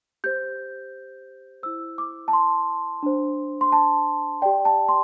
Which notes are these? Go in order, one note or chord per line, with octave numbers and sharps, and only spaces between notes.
G4 C5 G6
E4 C5 E6
D6
A5
C6
D4 C5
C6
A5
G4 D5 G5
A5
C6